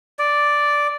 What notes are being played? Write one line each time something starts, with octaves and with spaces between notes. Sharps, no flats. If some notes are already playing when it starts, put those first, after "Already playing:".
D5